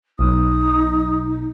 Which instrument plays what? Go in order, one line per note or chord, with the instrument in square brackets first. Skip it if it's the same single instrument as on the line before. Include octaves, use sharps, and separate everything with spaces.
[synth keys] B1 [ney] D#4 [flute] D#6